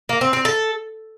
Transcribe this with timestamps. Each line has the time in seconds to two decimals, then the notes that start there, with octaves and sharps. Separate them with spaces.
0.09 A#3
0.21 C4
0.33 C4
0.45 A4